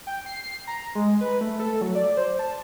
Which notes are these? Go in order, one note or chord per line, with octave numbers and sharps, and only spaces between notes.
G5
C7
A#5
G#3
B4
A3
A4
F#3
D5
C5
A5